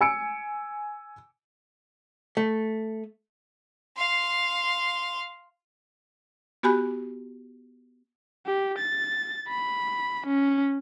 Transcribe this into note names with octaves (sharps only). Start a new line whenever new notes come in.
G#5 E6 C#7 D7
A3
F5 C6
B3 F#4 G4 G#5 B5 F#6
G4
A6
B5
C#4